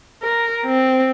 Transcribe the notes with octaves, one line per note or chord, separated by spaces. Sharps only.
A#4
C4